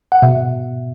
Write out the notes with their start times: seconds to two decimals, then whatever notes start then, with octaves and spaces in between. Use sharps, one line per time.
0.12 F#5
0.22 B2 E5